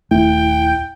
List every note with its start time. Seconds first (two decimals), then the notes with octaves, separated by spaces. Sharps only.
0.11 D#1 A3 E4 G5